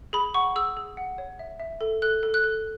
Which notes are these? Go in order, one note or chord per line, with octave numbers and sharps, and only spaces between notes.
G#4 B5
F#5 C#6
G#4 E6
G#4
F#5
C#5
E5
E5
A4
A4 F#6
A4
F#6
A4